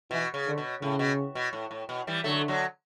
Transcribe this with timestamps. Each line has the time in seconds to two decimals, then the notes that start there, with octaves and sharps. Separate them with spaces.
0.11 B2 E3
0.34 C#3
0.47 D3
0.58 B2
0.81 A2 C#3
0.99 B2
1.35 B2
1.53 A2
1.71 A2
1.89 B2
2.07 E3 G3
2.24 D3 F#3 A3
2.48 D3 F#3